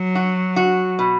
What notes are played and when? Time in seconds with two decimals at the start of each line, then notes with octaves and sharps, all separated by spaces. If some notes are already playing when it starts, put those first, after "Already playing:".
Already playing: F#3
0.15 F#4
0.56 F#4
0.99 B2